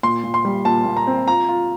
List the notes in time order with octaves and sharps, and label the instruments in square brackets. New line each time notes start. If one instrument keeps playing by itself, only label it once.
[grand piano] A#2 C6
A#2
C6
G3
A#2 A5
A#2
A#5
C4
F4 A#5
F4